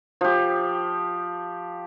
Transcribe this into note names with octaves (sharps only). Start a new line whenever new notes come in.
F3 G4